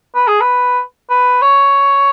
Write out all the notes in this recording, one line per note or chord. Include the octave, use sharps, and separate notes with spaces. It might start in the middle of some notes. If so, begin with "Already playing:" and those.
B4
G#4
B4
B4
C#5